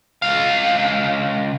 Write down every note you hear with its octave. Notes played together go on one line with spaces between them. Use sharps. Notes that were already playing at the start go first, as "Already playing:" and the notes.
C#2 F5